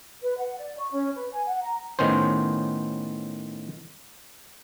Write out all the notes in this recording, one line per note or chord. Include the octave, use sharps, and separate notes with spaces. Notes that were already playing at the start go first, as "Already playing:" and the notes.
B4
F#5
D5
C#6
C#4
B4
G#5
F#5
A#5
A2 D#3 B3 C#4 C5